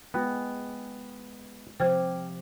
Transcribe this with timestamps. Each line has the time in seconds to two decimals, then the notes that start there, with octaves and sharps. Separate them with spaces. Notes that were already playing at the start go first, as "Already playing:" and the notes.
0.14 G#3 B3 F4 G5
1.80 C3 F3 G4 C5 G5 F6 G#6